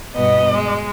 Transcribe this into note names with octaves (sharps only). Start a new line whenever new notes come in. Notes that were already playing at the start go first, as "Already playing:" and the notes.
G2 B2 B3 D#5
G#3